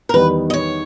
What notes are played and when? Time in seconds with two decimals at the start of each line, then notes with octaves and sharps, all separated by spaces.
0.09 A#4
0.13 E2 D#3 G3 B3 D#4 B4
0.50 D#5
0.54 C#5